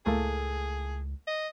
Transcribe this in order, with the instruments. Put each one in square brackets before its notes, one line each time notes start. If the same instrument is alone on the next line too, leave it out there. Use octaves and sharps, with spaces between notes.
[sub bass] C#2 [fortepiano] A2 A3 A#3 [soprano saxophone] G#4
[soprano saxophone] D#5